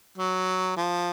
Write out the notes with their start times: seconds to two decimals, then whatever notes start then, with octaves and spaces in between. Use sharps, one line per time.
0.18 F#3
0.77 F3